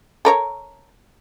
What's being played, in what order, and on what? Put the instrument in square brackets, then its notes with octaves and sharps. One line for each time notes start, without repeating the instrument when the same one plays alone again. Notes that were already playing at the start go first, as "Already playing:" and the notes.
[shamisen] A4 A#4 C#5